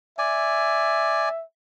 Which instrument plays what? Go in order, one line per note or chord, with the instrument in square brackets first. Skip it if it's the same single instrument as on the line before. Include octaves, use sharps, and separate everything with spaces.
[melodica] D5 G#5 [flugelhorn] E5